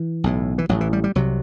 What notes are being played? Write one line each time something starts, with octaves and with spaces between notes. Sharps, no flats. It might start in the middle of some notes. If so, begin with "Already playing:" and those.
Already playing: E3
B1 A2
E3
A1 A2 F#3
E3
G3
G3
C2 C3 F#3